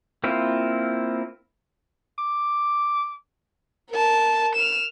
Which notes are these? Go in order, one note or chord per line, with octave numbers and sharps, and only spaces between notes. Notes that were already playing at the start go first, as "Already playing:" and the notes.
A#3 C4 E4 F4
D6
A#4 A5
F6 E7